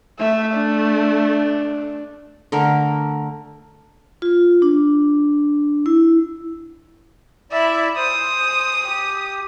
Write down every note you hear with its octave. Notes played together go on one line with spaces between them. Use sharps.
A3 E5
D4
D3 A3 A#4
F4
D4
E4
E4 D5 E5
C5 D#6
G4